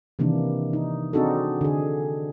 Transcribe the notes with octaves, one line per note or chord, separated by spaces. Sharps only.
C3 D#3 E3 A#3 D4
D#4
C4 D4 D#4 F#4 G#4 A4
D3 G#4